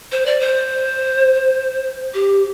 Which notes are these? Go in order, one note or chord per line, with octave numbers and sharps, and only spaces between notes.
C5
D5
C5
G4